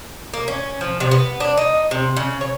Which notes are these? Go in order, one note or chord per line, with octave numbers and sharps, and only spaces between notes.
A#3
C#4
F3
C3
B3
D4
D#4
C3
C#3
C#5